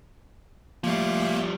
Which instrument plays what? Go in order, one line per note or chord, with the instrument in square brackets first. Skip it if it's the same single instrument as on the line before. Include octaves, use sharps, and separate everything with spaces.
[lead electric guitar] F3 G3 [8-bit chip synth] A3 A#3